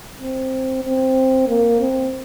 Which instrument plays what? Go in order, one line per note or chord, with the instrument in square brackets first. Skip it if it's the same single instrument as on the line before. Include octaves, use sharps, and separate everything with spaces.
[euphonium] C4
C4
A#3
C4